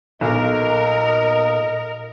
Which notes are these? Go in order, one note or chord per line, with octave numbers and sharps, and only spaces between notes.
B1 A#2 A#4 D#5